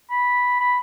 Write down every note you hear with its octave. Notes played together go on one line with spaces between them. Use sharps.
B5
B5